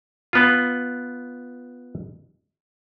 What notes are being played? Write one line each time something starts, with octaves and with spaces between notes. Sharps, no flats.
B3 F4